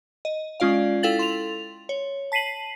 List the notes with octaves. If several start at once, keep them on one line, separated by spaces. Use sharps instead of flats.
D#5
G#3 C#4 F4 D5 F5
E4 A4 F5 G5 A6 F#7
C6 F7
C#5
A5 B6 C7 D#7 F#7